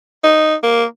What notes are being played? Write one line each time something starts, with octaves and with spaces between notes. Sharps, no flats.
D#4
A#3